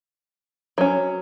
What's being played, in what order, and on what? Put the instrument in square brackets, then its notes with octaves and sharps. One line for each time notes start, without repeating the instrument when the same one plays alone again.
[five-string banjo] F#3 C#4